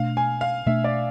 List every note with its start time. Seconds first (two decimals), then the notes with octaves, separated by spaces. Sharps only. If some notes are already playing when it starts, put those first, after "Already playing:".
Already playing: B2 A3 D4 F5
0.17 G#5
0.41 F5
0.66 B2 A3 D4 E5
0.84 D5